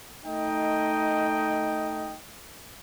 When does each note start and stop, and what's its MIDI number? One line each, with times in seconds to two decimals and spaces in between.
0.25 2.17 57
0.25 2.17 63
0.25 2.17 75
0.25 2.17 79